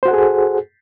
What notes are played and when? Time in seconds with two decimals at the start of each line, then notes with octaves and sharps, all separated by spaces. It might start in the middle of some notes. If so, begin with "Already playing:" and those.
0.03 C5
0.05 F#4
0.08 F#5
0.11 A4
0.13 G#4